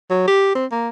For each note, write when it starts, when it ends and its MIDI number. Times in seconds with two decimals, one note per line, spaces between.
0.10 0.24 54
0.27 0.52 67
0.55 0.66 60
0.72 0.89 58